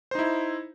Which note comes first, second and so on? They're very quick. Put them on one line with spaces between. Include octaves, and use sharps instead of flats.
C5 D#4 E4